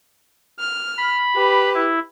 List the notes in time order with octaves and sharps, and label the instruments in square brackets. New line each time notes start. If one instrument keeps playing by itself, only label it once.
[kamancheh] F6
[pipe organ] B5
[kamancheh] G4 B4
[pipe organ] E4